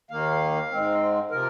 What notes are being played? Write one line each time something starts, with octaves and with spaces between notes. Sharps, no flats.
D#2 D#3 A#3 F5
G#2 G#3 C4
C3 F3 A#4